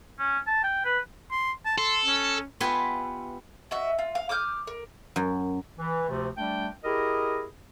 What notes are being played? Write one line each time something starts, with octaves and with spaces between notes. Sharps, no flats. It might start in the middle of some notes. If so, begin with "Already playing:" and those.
C#4
A5
G5
B4
C6
A5
A4 C6
C#4
B3 F4 G4 B4 E5 G#5
F#4 D#5 E5
F4
F5
D6 D#6 F6 G6
A#4
F#2
E3
D2 C3 F3 A3
G3 A3 D4 G5
E4 G4 G#4 A#4 D#5